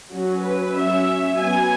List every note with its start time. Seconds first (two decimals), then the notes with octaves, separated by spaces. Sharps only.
0.12 F#3 C#4 F#4
0.44 B4
0.77 F#3 C#4 E5
1.40 F#3 B3 G#5